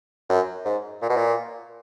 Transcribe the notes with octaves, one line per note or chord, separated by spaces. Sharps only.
F#2
G#2
A#2
B2
A#2